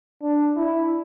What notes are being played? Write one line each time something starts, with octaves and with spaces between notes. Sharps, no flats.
D4
E4